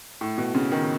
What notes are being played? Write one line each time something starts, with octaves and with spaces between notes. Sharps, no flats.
A2
B2
C#3
D#3